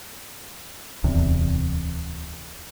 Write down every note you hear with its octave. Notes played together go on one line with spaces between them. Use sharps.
D1 E2 C3